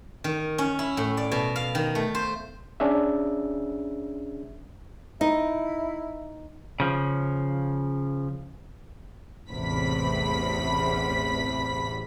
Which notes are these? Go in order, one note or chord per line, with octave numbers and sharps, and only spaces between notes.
D#3
C#4
E4
A2
D5
B2
F5
D#3
A3
C5
C#4 D4 G#4 E5
D#4 E4
C#3 F3
A1 E2 C3 B5 B6